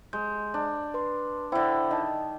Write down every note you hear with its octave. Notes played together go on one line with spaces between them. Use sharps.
G#3 G6
D4
B4 C6
D3 E4 C5 G5
D#3 D#5 A5